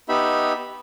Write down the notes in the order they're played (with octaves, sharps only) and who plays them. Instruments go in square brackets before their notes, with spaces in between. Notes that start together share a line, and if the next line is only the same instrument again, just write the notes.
[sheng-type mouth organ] B3 D#4 G4 E5 B5